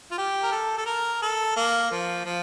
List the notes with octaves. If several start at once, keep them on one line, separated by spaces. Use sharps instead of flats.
F4
G4
A#4
A4
A4
A#4
A4
A#3
F3
F3